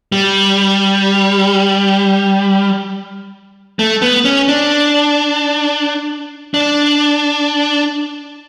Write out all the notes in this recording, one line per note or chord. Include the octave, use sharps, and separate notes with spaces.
G3
A3
B3
C#4
D4
D4